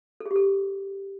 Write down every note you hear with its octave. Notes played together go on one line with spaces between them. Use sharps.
A4
G#4
G4
A4